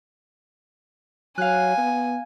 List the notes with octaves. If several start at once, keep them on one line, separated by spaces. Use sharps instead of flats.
F#3 F5 G#5 F#6
B3